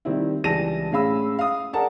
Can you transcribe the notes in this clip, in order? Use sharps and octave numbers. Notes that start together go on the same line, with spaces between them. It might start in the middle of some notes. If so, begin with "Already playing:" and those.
D#3 G3 C4 E4
C#2 E3 G3 A5 A#6 D#7
A2 G#3 C#4 F5 B5 E6
F5 D#6
G#4 A#4 D5 F#5 A5 A#5